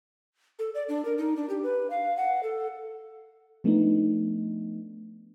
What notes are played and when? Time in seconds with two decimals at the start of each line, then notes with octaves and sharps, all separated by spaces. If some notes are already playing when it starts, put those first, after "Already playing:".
0.59 A4
0.75 D5
0.89 D4
1.05 A#4
1.18 D#4
1.36 D4
1.49 G4
1.63 B4
1.90 F5
2.17 F#5
2.43 A4
3.64 F3 A3 B3 D4 D#4